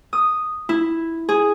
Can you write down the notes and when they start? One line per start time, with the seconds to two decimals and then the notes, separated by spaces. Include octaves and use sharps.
0.13 D#6
0.69 E4
1.29 G#4